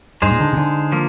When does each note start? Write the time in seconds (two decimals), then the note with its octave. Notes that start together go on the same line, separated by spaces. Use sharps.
0.22 G2 G#3 D#4 G#4 C5
0.32 A#2
0.40 D3
0.53 C3
0.57 D3
0.92 F3 A#3